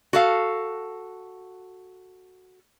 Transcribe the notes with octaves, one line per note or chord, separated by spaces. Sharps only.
F#4 A4 F5